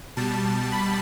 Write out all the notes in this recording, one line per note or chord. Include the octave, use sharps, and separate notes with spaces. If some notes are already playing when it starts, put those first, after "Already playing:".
B2 G3 A5
B5